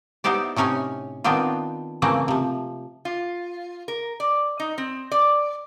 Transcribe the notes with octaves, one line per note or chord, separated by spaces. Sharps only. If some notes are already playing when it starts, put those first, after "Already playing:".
B3 D#4 E4 G4 C5 D5
A2 C3 C#4 D#4 G#5
D#3 B3 C4 D4 F4
C#3 E3 A3 A#3 C4
C3 F3
F4
A#4
D5
D#4
C4
D5